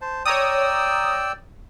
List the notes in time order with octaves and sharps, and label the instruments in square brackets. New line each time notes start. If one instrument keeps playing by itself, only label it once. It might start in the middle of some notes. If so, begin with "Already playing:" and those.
[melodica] C5 A5
[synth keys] C#5 A#5 D#6 [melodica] D5 G5 E6